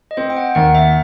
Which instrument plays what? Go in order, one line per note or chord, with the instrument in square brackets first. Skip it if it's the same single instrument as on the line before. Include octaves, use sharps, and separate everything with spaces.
[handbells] D#5
[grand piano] C4 [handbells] C5
[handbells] G5
F#5
[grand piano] D#2 [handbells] F#5
[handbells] E5